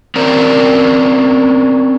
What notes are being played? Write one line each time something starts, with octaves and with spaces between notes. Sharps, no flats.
C4 C#4 A#4 D5